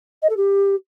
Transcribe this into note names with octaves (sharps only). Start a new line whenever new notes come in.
D#5
A4
G4